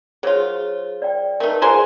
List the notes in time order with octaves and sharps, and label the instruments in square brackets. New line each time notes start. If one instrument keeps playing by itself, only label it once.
[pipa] F#3 F4 [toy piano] G#4 C5 C#5
[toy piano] D5 G5
[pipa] A3 D#4 [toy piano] A#4 B4
[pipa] F4 G#5 C6 [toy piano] G#4 C5 A#5